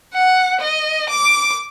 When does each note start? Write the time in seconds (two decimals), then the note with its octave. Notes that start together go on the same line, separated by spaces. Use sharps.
0.13 F#5
0.61 D#5
1.09 D6